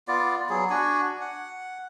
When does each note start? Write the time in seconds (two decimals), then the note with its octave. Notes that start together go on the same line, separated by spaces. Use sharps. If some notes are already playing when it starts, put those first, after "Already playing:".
0.08 B3 F4 D5
0.50 F#3 B3 G#4
0.70 D4 F#4 G#5
1.21 F#5